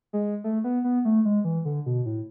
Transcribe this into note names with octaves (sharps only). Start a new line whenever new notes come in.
G#3
A3
B3
B3
A3
G#3
E3
D3
B2
A2